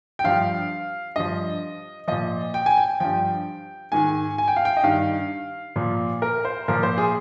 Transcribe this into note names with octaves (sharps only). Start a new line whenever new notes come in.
G5
G2 F3 F5
G2 F3 D#5
A#2 F3 D#5
G5
G#5
G5
G2 F3 G5
G#2 D#3 G#5
G#5
G5
F5
G5
D#5
G2 D#3 F5
A#2 F3
A#4
C5
A#2 F3 A#4
C5
G#4